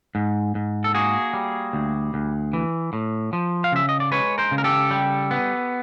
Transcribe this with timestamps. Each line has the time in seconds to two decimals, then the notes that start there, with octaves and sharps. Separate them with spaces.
0.15 G#2
0.55 G#2
0.84 A4
0.94 A#3 F#4 G#4
1.34 G3
1.73 D2
2.14 D2
2.53 E3
2.93 A2
3.33 F3
3.64 F5
3.72 C#3 E5
3.89 D#5
4.00 D5
4.11 G#3 B4 C#5
4.38 A#4 C5
4.51 C#3
4.58 A#4
4.64 G4 A4
4.91 G3
5.31 B3